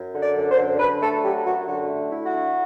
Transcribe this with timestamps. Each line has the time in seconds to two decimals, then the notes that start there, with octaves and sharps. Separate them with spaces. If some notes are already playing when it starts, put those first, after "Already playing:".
Already playing: F#2
0.15 D3
0.21 D5
0.36 F#2
0.51 C5
0.58 D3
0.79 D3 B4
1.01 A3 A4
1.22 F#3 G4
1.44 F#2 F#4
1.66 D3 F#4
1.88 A3
2.09 E4
2.24 F#4
2.31 D3